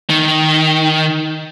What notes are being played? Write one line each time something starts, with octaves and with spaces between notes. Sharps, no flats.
D#3